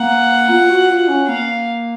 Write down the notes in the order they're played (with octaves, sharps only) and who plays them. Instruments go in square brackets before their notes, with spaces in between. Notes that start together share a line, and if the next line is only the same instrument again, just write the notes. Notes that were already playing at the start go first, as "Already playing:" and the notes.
Already playing: [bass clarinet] A#3 [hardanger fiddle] F#5
[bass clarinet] F4
F#4
F4
C#4
[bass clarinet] A#3 [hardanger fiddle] F5